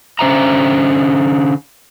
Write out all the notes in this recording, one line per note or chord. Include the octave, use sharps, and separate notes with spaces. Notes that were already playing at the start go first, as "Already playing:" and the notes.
D3 C#4 C5 E5 A#5